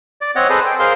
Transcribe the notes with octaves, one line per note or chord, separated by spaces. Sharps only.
D5
C4 C#5 D#5 F#5
G#4 A4 B4 C5 D#5
G5
G#4 A#4 C5 F5 C6